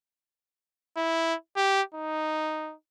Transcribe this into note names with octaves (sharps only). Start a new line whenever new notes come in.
E4
G4
D#4